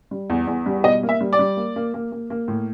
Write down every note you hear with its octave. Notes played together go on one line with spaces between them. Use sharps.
G3
E2
E2
G3
B2 D#5
A#3
E5
G3
D5
G3
A#3
A#3
A#3
A#3
A#3
A2